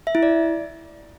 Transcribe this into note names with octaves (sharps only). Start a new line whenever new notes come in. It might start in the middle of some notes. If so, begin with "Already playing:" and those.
E5
E4
D5